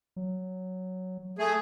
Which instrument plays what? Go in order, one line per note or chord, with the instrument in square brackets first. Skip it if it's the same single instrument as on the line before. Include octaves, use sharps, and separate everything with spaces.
[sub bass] F#3
[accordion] A3 G#4